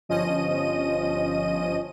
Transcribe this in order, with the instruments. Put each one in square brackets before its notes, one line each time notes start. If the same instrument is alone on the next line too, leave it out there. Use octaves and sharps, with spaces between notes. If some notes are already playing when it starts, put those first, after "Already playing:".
[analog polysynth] G1 F3 C#4 D#5 D#7